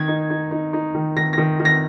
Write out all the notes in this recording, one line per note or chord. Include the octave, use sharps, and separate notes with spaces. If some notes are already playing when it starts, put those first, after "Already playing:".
Already playing: D#3 G#6
D#4
D#4
D#4
D#4
D#3
D#3 A#6
D#3 A#6
D#3
A#6